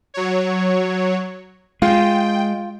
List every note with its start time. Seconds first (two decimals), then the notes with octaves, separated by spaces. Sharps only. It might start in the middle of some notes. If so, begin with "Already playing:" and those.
0.14 F#3 C#5
1.82 G#3 F4 G5